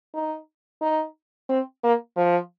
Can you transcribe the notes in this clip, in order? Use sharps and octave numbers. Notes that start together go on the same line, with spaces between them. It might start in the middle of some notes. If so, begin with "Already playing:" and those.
D#4
D#4
C4
A#3
F3